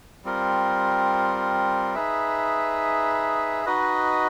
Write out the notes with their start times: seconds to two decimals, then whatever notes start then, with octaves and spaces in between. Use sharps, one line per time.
0.25 G3 C4 F4 A#4
1.95 D#4 G#4 B4 E5
3.66 D#4 F#4 B4 D#5